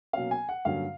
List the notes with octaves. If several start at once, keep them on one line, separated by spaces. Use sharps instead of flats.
B2 F#3 A#3 C#4 F5
G#5
F#5
G2 D3 F#3 A#3 C#4 F5